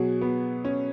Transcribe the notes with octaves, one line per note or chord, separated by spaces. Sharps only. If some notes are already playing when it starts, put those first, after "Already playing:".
Already playing: B2 F#3 G#4
B3
C#4